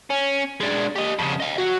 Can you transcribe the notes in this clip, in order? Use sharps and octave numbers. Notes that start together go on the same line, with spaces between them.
C#4
G#3 D4
G4 D#5
F2 C#3
D#5 F5
F#3 F#4